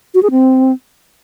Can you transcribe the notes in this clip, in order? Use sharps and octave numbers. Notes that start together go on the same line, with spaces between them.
F#4
G#4
C4